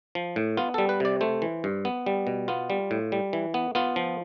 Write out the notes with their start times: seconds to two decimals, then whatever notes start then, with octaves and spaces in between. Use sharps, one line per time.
0.15 F3
0.36 A2
0.57 B3 F4
0.74 G3 A4
0.89 B4
1.00 C3 D5
1.21 A3 C5
1.42 E3
1.64 G2
1.85 B3
2.06 G3
2.27 B2
2.48 B3 F4
2.70 G3
2.91 A2
3.12 G3
3.33 E3
3.54 B3
3.75 B3 F4
3.96 F3